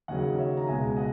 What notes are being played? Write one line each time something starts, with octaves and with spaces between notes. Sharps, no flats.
D#2 C#3 F#3 D#5 F#5
C#5 E5
A#5
C#2 B2 G#3 E5 G#5
D#5 F#5